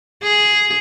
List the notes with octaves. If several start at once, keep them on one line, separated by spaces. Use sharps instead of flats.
G#4